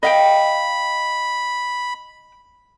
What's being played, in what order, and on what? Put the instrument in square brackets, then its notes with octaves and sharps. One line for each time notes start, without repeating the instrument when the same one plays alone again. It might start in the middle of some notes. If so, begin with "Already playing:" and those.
[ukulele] D#5 F5 G5 [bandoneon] B5